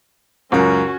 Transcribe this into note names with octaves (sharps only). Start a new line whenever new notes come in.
C#2 F#2 C#4 F#4 A#4